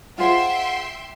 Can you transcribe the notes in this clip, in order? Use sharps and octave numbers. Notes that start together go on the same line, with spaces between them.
F4 G#4 C5 E5 F#5 G5 C6